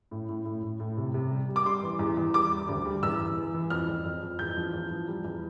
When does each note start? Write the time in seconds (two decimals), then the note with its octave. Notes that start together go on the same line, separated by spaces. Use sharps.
0.11 A2
0.29 A2
0.45 A2
0.63 A2
0.80 A2
0.97 C3
1.14 C3
1.31 G3
1.49 G3
1.56 D6
1.66 G3 C6
1.83 E3
1.99 E2
2.17 E2
2.34 G3 D6
2.52 G3
2.69 D2
2.85 G3
3.03 E2 E6
3.19 E2
3.37 E3
3.54 E3
3.70 F2 F6
3.89 F2
4.05 F2
4.23 F2
4.39 E2 G6
4.57 F3
4.74 E2
4.91 F3
5.08 G3
5.25 E2